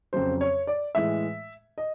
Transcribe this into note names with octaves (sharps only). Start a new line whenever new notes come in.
F2 C#3 F#3 C5
C#5
D5
A2 E3 G#3 E5
D#5